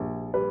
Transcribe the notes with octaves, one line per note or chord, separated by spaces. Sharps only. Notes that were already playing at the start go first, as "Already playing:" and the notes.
Already playing: A#1 G3
G3 B4